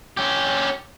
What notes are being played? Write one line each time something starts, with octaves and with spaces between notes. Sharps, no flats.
C#4 G4